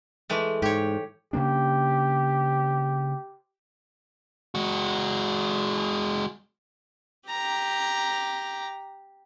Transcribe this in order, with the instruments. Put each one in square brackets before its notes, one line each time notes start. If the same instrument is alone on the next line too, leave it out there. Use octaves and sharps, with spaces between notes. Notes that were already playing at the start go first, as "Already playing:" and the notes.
[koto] E3 G#3 A3
[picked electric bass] G#2 [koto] G4 C#5
[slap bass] C#3 A#3 D4 [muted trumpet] G4
[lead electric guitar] G#3 F#4
[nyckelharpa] G4 A#5